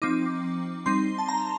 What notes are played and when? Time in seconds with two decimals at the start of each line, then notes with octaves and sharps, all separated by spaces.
0.02 F3 C4 D#4 D6
0.86 G3 C4 D#4 C6
1.18 A5
1.29 A#5